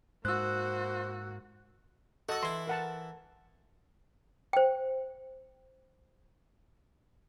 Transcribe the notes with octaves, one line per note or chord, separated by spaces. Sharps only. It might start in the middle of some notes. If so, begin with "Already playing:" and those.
G#2 A#3 F#4 C5 E6 F#6
F#4 A4 D#5 F#5
E3 E4 C6
A#4 F#5 A5
C5 G5